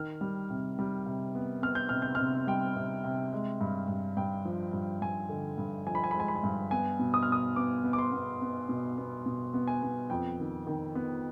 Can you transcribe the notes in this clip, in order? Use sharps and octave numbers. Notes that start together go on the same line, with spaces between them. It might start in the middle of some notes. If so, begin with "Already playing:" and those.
Already playing: D#3 F6
G3
C3
G3
C3
B3
B3 F6
G6
C3 F6
G6
C3 F6
G3 G5
C3
C3
G#3
G2
G2
G2 G5
F3
G2
G2 G#5
D3
G2
F3 G#5
B5
G#5
B5
G#3 G#5
B5
G#5
G2
B3 G#5
B2
D#6
F6
B2 D#6
B3 D6
B3
D6
C6
B3
B3
B2
B3
B2
B3
G#5
B3
F2 G5
D#3
D#3
B3